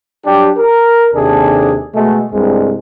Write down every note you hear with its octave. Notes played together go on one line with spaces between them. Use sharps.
F#3 D4 G4
A#4
D#2 C3 D4 G#4 A4
B2 G#3 A3
C2 G2 C3 G#3